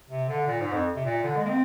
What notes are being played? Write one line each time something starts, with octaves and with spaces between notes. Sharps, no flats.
C3
D3
A#2
G#2
F2
C3
A#2
D3
G#3
A#3
C4